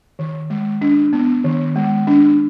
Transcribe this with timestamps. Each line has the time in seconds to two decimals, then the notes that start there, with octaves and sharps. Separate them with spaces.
0.19 D#3
0.50 G#3
0.81 D4
1.13 B3
1.44 D#3
1.76 G#3
2.07 D4